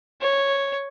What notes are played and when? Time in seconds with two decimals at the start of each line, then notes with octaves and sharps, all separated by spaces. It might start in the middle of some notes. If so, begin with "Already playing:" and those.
0.21 C#5